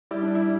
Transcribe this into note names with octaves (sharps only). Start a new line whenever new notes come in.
G3 E4
D4
E4